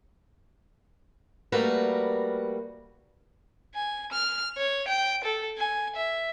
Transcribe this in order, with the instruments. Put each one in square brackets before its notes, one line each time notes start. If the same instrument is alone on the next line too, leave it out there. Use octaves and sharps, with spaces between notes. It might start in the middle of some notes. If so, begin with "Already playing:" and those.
[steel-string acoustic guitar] G3 A3 A#3 F#4 A#4 B4
[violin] G#5
F6
C#5
G5
A4
G#5
E5